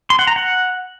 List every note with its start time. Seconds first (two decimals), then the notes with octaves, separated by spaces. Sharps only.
0.10 C6
0.19 F#5
0.27 A#5
0.36 F#5